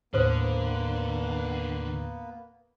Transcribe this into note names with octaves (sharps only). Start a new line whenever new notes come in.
D#2 A2 D3 A#3 B3 B4 C5 D#6